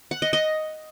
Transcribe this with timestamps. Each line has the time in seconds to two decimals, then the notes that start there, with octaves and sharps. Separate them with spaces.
0.11 F#5
0.22 D#5
0.33 D#5